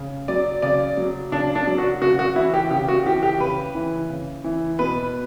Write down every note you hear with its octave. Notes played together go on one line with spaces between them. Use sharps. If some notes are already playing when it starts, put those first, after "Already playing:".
Already playing: C#3
F#3 D5
C#3 D5
F#3
C#3 D4
D4
F#3
F#4
C#3 F#4
F#4
E3 E4
G4
C#3 G4
F#4
E3 G4
G4
C#3 B4
E3
C#3
E3
B2 B4